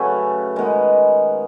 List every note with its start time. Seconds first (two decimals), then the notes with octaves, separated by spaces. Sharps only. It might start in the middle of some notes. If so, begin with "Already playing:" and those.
Already playing: C#3 F#3 A3 C#4 B4
0.56 D#3 G#3 B3